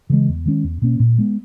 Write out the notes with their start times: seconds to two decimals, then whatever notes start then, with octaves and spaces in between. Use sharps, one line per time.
0.10 C#3 E3 G#3
0.29 E2
0.46 D#3 G#3 C#4
0.64 E2
0.82 B2 A#3 C#4
1.00 A#2
1.18 G#3 B3